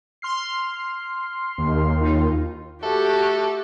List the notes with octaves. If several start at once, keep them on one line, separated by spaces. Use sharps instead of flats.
C6 F6 C7
D#2
D#4 F4
A3 F#4 G4 A4